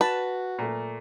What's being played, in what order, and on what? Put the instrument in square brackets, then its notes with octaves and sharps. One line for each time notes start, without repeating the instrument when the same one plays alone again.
[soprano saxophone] F#4 [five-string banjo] B4 [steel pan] A5
[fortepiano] A#2 A3